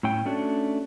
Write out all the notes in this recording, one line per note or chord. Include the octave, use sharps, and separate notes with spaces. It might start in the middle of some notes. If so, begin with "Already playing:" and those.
A2 C#4 G5
A3 C#4 D4 F#4